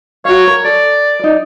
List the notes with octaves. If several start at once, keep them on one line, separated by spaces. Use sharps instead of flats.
F#4 C#5 F5
A#4
A4 D5
D#4 D5